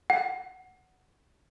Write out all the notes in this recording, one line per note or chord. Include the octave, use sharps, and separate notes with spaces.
F#5